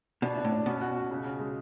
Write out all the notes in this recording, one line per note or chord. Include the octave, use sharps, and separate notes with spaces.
B2 D4
D4
A2
D4
B2 C#4
F#4
F#4
C#3
C#3
G#3